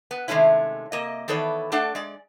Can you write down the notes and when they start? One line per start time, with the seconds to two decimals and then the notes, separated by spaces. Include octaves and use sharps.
0.11 B3
0.28 C3 D#3 G#3 A3 C#4 E4
0.92 C3 A#3 D#5
1.28 D#3 E3 B3 A4 C#5 D5
1.72 A3 D4 A4 D5 F#5
1.95 G#3 D5